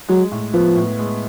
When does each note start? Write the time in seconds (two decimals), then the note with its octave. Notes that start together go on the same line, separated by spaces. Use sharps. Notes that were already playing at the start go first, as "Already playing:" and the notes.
0.09 F#3 G#3
0.31 A2
0.54 F3 B3
0.76 A2
0.99 G#3